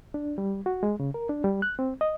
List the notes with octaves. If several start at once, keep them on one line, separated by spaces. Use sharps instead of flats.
D4
G3
F#4
G#3
C#3
A#4
D4
G3
F#6
C4
D#5